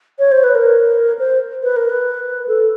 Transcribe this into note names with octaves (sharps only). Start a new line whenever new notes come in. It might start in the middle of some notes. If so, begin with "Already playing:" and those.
C#5
C5
B4
A#4
C5
B4
A#4
B4
A4